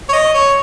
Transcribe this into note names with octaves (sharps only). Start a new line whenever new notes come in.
C#5
D#5
C#5